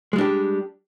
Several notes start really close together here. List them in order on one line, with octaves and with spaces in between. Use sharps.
G#3 G3 D4 G4